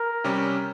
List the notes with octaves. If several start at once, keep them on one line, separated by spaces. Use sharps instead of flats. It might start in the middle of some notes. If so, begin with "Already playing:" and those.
Already playing: A#4
C3 G3 C#4 G4